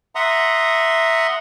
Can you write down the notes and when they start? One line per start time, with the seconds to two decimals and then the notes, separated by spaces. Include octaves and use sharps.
0.15 E5 F#5 A#5 C6 D#6